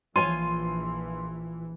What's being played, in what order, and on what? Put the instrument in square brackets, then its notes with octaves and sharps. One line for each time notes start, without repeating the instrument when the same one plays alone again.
[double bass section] A#1 E3 [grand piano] F3 C6 D#7 [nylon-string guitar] F4 C#5 G#5